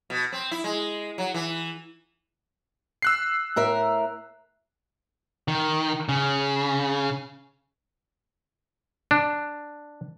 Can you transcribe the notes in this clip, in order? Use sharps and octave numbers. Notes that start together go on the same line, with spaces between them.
B2
C4
E4
G#3
F#3
E3
E6 F#6 C7
A2 A#4 E5
D#3
C#3
D4